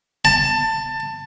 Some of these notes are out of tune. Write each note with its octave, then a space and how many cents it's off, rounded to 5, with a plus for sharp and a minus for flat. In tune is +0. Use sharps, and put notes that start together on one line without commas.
A5 +20